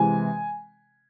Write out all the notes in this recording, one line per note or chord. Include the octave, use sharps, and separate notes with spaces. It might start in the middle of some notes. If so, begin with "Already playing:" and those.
Already playing: C3 E3 G#3 C4 G#5